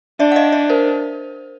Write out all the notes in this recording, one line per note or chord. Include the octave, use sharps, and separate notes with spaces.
D4 D5 E5
F#5
D#5 F5
D5 E5
A#4 C5